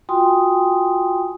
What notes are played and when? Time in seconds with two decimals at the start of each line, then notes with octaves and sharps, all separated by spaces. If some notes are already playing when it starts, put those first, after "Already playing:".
0.09 F4 F#4 G5 G#5 C6 D#6